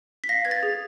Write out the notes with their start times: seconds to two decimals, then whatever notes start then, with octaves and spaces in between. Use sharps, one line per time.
0.24 B6
0.29 F5 A#6
0.45 B4 G#6
0.51 A6
0.63 G#4